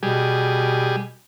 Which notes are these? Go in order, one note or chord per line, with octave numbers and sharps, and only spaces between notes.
B2 G3 G#4